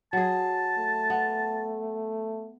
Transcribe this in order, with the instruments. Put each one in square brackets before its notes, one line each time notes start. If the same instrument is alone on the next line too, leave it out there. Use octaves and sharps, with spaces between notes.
[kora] F#3 G#4 [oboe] A5
[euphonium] A3
[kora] B3